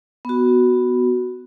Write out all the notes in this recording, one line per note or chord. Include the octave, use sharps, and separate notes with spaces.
B3 F#4